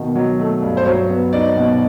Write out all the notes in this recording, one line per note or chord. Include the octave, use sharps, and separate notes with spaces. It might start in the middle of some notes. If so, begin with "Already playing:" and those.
Already playing: B2 D#3
F#3
A3
G2
C5
F#3 C#5
B3
D#4 D5
B2